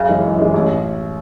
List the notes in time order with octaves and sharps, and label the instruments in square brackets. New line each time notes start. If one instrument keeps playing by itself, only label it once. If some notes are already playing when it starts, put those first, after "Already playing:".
Already playing: [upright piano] F#2 [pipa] C#3
[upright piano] E3 G#3 D#4 G#4
F#2
E3 G#3 D#4 G#4
A1